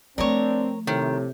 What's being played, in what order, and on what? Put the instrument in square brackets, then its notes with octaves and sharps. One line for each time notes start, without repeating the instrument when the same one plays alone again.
[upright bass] F3 A3 [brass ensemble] C4 [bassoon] D4 [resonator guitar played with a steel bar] A#4 C#5
[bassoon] A2 [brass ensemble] C3 [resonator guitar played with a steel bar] D#3